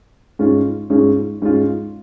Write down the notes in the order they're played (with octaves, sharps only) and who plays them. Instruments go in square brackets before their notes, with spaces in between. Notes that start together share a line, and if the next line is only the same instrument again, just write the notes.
[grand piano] G#2 G#3 C#4 F4
G#2 G#3 C#4 F4
G#2 G#3 C#4 F4